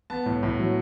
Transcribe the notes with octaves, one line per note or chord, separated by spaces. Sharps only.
B3 A5
A2
A2
F#3